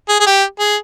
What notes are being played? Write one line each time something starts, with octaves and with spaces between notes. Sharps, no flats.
G#4
G#4
G4
G#4